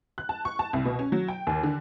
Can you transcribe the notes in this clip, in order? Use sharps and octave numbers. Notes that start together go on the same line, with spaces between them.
F#6
A5
C#6
A5
C2
B2
C#4
F#3
G5
D#2
D3